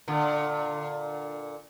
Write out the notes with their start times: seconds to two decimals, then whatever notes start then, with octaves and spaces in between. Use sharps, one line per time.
0.08 A#2 D3